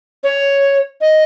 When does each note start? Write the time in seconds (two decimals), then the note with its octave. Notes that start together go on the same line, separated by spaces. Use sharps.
0.24 C#5
1.01 D#5